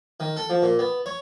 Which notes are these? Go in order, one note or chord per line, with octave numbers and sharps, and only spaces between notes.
D#3
A4
F3
A#2
B3
C#5